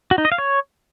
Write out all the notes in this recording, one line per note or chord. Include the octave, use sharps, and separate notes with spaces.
F#4
D#4
D#5
F5
C#5